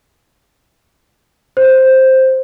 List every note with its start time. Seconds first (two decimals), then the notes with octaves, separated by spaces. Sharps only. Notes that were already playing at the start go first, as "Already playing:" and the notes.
1.57 C5